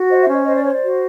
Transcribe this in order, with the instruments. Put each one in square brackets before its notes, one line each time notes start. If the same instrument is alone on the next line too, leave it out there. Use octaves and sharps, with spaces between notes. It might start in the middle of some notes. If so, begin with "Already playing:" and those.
Already playing: [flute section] F#4
C5 D#5
E5
C#4 D#5
C5 D#5
D5
C5 C#5
D5
F#4